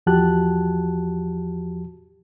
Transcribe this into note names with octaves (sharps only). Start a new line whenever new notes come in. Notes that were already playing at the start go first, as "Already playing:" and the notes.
E2 F3 F#4 G4 A5 F#6